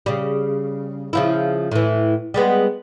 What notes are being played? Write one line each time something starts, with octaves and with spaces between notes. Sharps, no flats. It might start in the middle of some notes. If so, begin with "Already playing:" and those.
C#3 G3
C#3 F3 E4
A2 E3
G3 G#3 B3